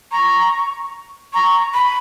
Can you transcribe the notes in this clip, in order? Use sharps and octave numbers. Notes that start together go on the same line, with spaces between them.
A#5 C#6
A#5 C#6
B5